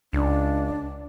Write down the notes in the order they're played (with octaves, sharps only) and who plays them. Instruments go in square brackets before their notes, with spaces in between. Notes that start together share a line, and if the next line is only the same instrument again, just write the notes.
[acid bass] C#2 [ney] D4